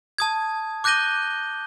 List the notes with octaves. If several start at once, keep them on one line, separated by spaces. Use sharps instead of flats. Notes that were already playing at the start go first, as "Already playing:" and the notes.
A5 D#6 G#6
D6 F#6 G6 A#6 D#7 G7